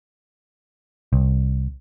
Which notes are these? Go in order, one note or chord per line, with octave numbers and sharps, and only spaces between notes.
C2